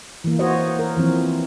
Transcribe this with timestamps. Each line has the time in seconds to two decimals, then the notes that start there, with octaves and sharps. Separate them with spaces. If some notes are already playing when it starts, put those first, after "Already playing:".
0.24 E3 A#3
0.39 F#4 C5 C#5 D#5
0.79 A#4
0.97 E3 F3 C4